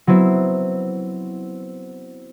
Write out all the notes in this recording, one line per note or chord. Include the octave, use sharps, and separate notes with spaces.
F#3 B3 C4 E4